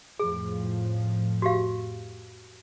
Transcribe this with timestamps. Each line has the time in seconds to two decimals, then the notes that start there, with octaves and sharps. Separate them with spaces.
0.20 F2 A2 F3 G#4
1.42 F#4 G4 F5